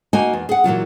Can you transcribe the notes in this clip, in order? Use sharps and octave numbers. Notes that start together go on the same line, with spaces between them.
A#3 D#4 F#4 D#5 G#5
E2
G#4 F#5
A#2 E3 F#3 F4